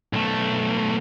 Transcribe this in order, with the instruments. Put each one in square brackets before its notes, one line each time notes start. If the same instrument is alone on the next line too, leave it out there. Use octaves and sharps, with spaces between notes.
[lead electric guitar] B1 A3